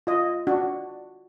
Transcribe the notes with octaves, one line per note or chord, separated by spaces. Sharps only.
F4 D#5
D4 F#4